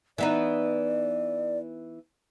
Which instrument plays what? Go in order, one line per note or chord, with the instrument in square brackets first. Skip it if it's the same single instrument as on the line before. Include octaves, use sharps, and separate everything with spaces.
[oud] E3 B3 D#4 [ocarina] D5